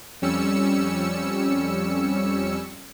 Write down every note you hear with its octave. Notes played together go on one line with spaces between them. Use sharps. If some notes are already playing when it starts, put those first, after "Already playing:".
F2 G3 C#4 E6 C#7